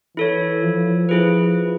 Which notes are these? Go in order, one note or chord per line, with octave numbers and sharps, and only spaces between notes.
E3 E4 A4 C#5
F3
F3 E4 G#4 B4